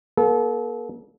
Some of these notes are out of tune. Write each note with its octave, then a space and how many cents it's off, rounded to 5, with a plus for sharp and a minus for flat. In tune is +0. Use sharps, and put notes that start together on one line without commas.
A#3 +40 A4 -35